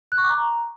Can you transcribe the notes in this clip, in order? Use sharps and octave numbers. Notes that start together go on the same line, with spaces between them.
F#6
C#6
D6
A#5